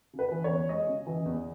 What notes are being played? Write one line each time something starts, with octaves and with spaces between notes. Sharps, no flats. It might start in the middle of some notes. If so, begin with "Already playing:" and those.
C#3
B4
E3
C#5
E2
G#3 D#5
C#3
E3
E2